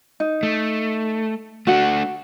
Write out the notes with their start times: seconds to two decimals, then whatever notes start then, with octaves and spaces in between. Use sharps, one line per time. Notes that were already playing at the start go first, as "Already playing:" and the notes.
0.20 D#4
0.43 A3
1.67 A3 D4 F#4 F#5